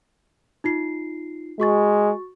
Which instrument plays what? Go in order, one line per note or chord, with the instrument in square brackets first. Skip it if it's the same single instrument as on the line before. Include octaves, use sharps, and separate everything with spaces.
[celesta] D#4 F4 C7
[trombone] G#3 [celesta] F#4 C#6 A6